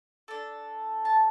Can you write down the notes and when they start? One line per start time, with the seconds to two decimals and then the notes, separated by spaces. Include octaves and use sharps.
0.28 D4 A4
1.05 A5